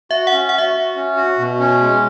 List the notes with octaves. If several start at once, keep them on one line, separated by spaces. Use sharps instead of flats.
F#4 E5
C#4 F#5
F#4 F#5
E5
F#4
C#4
F#4
B2
C#4
G#3